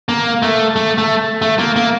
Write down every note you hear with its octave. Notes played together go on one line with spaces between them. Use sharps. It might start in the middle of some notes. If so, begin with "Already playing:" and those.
A#3
A3
A3
A3
A3
A#3
A#3